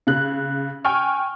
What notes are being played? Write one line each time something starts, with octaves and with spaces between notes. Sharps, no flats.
C#3 F#6
G5 G#5 C#6 F6